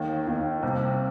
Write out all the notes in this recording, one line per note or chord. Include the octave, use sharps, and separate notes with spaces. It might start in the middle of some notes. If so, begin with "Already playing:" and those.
Already playing: D#2 D#3
D#2 D#3
C2 C3